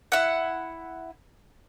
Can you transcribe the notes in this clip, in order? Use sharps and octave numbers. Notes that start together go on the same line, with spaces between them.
E4 F#5